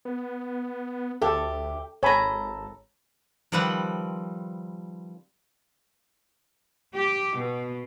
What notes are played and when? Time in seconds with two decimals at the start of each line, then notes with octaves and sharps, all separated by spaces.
0.05 B3
1.22 D2 G4 A4 E5
2.03 G#1 A4 C#5 G#5 A#5 B5
3.52 D#3 F3 G3 C4 B4 F#5
6.94 G4
7.38 B2